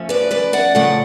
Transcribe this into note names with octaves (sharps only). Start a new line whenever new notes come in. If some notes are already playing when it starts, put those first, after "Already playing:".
Already playing: F3 A3 C#4
B4 D5
B4 D5
D5 F#5
C#3 F3 A3 D5 F#5